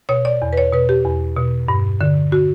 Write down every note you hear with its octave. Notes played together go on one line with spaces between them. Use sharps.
B2 C#5
D5
E2
B4
C#5
B2 B4
G4
E2
B2
G2
D3
F#4